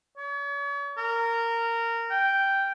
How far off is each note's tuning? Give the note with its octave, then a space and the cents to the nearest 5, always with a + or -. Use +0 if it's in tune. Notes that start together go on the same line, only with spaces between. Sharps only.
C#5 +40
A#4 -15
G5 -5